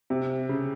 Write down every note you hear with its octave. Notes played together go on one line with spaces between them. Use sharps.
C3
C#3